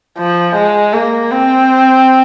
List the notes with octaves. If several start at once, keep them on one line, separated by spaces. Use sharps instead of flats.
F3
G#3
A#3
C4